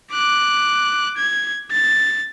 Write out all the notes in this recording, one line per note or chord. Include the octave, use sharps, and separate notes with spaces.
D6 F#6
G#6
A6